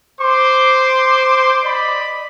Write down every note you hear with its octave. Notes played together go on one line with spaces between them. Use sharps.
C5 C6 D6
D5 D#5 B5